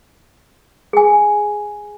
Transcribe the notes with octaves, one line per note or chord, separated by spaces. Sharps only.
G#4 G#5